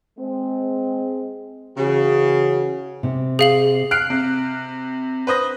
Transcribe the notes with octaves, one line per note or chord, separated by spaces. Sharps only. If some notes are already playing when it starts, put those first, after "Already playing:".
G#3 C4
C#3 E3 F#4
C3
G#4 F5 F#7
F6 F#6 C7 D7
C3
B4 C5 D#6 A#6